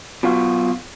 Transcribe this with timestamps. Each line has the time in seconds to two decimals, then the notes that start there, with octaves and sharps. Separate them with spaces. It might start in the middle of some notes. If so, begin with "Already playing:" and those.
0.23 B2 F#3 F4 F#4